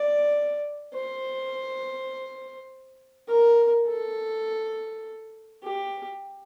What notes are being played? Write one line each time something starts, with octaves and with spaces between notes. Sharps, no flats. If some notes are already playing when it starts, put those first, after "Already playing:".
Already playing: D5
C5
A#4
A4
G4